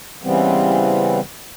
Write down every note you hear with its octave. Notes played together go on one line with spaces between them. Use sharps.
C#3 E3 G3 B3 C4